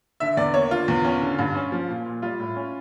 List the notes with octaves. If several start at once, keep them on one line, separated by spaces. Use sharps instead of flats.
D3 E5
E2 D5
A#3 C#5
D3 F4
E2
C#4
D3
G2
C#4
F3
A#2
A#2
G3 F4
A2
C#4